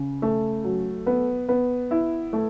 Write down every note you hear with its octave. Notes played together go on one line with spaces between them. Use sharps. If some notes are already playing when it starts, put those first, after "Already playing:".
Already playing: C#3
A3
F#3
B3
B3
E4
A3